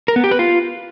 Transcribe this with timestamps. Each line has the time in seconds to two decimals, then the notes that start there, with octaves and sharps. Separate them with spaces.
0.08 A#4
0.16 B3
0.24 G4
0.31 B4
0.39 F4